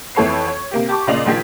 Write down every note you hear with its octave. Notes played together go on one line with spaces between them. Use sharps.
F2 E3 A4 C#5 B5 C7
C#5
C3 A#3 G4
G4 A5 C#6 D6
A#2 C#3 D5 D#5 C7 F7
A#1 D#3 F3 G#4 G5 B6